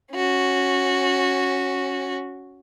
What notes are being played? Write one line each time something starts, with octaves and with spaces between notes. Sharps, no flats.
C#4 F#4